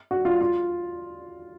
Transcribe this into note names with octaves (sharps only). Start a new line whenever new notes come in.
F#4
F4
F4